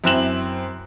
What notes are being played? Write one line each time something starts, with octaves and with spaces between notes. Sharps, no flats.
F#2 C4 E4 F#6 E7 F#7